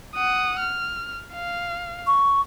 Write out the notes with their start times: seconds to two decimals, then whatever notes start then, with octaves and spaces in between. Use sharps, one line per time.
0.15 F#5 D#6
0.60 F6
1.34 F5
2.07 C#6